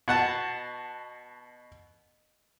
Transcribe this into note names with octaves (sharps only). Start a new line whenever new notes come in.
B2 F#5 A5